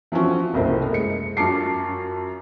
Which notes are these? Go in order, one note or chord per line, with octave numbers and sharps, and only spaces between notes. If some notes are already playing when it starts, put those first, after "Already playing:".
E3 F3 C4 C#4 F#4
F#1 C2 A3 A#3 C5
G#3 C#7
F#2 C#4 F4 A5 D6 C7